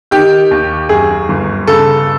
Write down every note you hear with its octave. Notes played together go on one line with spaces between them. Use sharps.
D#3 G4
D#2
F#2 G#4
G1
C#3 A4